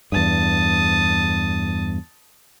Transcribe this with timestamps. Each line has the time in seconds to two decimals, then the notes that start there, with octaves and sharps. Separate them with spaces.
0.12 E2 G2 A5 D#6